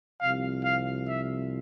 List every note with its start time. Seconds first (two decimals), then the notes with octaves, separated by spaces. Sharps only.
0.20 C2 C3 F3 F5
0.65 F5
1.08 E5